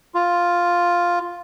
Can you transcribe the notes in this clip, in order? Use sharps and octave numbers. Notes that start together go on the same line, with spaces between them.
F4